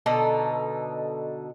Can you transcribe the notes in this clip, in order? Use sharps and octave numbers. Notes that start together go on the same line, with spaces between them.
B2 D3 D#4 A4